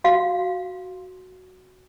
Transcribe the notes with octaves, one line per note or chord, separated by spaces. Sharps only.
F#4 F5